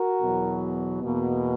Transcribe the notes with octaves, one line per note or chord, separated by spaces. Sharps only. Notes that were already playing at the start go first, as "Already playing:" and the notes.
Already playing: F#4 A#4
E2 B2 F#3
E2 B2 A#3